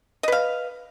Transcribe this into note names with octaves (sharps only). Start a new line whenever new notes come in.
B4 D#5 F5